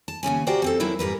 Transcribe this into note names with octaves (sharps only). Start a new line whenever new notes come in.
A5
D#2 C#3 C#4 G#5
F#4 G4 A#4 C5 D5 G5
F3 C4 A4
F3 F#3 E4 A#4
G#2 G3 A#4 B4